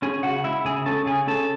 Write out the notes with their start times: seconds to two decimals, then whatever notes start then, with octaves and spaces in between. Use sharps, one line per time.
0.02 C#4 G#4 G#5
0.23 C#3 F#4 F#5
0.44 G#3 E4 E5
0.65 C#3 G#4 G#5
0.86 C#4 A4 A5
1.06 C#3 G#4 G#5
1.27 C#4 A4 A5